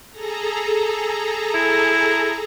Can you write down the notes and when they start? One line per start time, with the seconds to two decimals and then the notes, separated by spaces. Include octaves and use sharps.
0.10 G#4 A4 A#5
1.54 E4